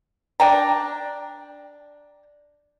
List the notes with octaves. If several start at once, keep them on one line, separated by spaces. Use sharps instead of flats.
D4 G5 A#5